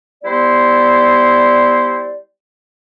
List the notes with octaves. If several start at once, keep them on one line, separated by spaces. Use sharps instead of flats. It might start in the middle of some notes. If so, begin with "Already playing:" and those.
G3 B3 E4 C5 D5